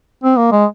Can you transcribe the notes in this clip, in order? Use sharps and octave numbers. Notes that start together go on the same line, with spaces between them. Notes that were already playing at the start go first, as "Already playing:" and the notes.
C4
A#3
G#3